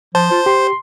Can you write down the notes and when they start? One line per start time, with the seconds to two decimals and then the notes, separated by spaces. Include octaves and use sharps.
0.15 F3 C5 A5
0.31 F4
0.46 G4 C6